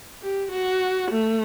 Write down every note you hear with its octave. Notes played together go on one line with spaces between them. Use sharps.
G4
F#4
A3